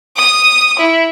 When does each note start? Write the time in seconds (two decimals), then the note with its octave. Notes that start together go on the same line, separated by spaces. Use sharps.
0.16 D#6
0.79 E4